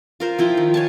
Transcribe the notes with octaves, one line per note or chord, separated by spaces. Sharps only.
F4 A#4 C5
F3 E4 F4 G5
D#3
C#5 G#5 A5